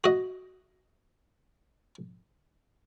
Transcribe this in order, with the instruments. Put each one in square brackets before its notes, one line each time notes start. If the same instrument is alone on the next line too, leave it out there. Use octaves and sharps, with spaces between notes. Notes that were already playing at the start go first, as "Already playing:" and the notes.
[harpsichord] F#4 D#5